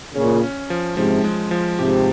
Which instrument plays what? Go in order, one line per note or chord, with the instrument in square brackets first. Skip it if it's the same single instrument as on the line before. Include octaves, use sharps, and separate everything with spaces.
[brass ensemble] A#2 C#3 [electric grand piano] C#4
[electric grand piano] C#4
F3
[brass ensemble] G#2 C3 [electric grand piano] F3
[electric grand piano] G#3
F3
[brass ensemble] G#2 C3 [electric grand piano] G4